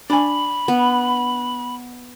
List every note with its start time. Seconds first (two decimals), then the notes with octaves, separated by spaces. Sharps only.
0.10 D4 G#5 B5
0.68 B3